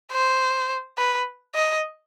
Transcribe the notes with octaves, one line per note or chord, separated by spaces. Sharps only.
C5
B4
D#5